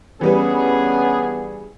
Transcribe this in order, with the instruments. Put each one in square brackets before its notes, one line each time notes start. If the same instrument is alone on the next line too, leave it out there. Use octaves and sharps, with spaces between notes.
[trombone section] G2 G#4 [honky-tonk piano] E3 G3 B4 [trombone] B3 [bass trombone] C#4